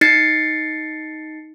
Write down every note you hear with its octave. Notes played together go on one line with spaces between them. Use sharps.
D#4 A6 C7 C#7